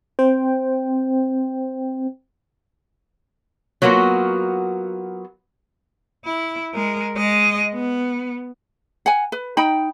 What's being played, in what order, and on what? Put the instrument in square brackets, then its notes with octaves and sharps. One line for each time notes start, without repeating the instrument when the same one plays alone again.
[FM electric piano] C4 C5 G5
[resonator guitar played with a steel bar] F#3 A#3 B3 F4 F#4
[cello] E4
G#3 A#4
G#3 D#5
B3
[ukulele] F#5 G#5
B4
D#4 G5 B5